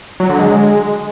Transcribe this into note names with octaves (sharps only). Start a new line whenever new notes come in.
F#3
D3
G#3